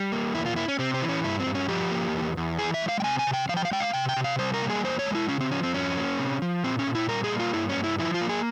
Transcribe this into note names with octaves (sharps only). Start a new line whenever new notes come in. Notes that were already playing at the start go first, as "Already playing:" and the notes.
Already playing: G3
A#3
E2 E4
F4
A#3 E4
C#4
C3 C4
C4
E3
C#4
G2 E4
C4
G2
C#4
F3 G4
A#3
E2
E2
E3 G#4
E5
G#3
F5
G5
C3 G#5
G#5
C3
G5
F3 F5
G5
F5
G#3 G5
F5
C3 G5
G5
C3
F5
G3 C5
A#4
A#3
G#4
E2 C5
C#5
G#3
E4
C#3 C#4
C4
F3 C#4
C4
F2 C#4
A#3
C3
F3
A#2 C4
C#4
A#2
E4
G3 A#4
G#4
A#3
F4
G2 E4
C#4
G2
E4
F3 E4
F4
A#3
G#4